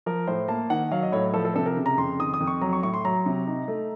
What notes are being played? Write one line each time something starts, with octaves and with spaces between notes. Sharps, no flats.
F3 A#4
A2 C5
A#3 A5
D#3 F#5
F#3 F5
D#5
A2 C#5
F3 A4
A4
C3 A4
A#4
C#3
A#5
F2 C6
D#3 D#6
D#6
F2
C#6
F#3 A#5
C#6
A2 C#6
C6
F#3 A#5
C3
D#4
A3